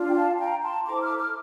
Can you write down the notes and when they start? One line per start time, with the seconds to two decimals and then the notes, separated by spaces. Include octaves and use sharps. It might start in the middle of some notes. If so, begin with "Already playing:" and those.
Already playing: D4 F4
0.09 G5
0.15 F5 A5
0.38 G5 A#5
0.63 A5 C6
0.86 E4 A4 C5 A#5 D6
1.02 D6 F6
1.19 D6 F6